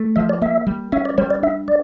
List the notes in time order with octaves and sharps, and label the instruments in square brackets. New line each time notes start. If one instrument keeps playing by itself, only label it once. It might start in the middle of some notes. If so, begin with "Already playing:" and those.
Already playing: [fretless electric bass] A3
[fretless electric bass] F3 [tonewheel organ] E5
[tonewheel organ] D5
[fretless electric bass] A#3 [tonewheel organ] E5
[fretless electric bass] G3
[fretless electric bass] C#4 [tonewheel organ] E5
[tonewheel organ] D5
[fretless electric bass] G3 [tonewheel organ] C#5
[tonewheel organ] D5
[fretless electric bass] D4 [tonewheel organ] E5
[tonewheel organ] D5